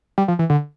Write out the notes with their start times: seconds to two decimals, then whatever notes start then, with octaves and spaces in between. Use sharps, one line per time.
0.18 G3
0.28 F3
0.39 E3
0.50 D3